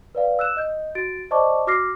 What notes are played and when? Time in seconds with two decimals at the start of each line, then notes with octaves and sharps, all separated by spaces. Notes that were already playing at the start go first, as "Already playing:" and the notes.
0.15 B4 D5 F5
0.39 E6 F#6 E7
0.57 D#5 G6
0.95 F#4 A6 D7
1.31 C5 D5 D#5 A5 C#6 D6
1.67 F#4 D6 F6 A#6 C7